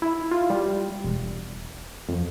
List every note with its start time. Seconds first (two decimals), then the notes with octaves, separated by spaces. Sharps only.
0.02 E4
0.31 F4
0.50 G3
1.04 E1
2.09 F2